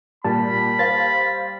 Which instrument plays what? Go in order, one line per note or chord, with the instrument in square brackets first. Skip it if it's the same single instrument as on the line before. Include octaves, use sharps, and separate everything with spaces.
[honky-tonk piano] A#2 [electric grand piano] G3 [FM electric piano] A5 [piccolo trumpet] B5
[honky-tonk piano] C5 F5 [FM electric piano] A6